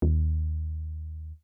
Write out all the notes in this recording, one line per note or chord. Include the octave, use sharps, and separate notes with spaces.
D#2